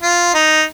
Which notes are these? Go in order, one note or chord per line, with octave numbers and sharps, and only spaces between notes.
F4
D#4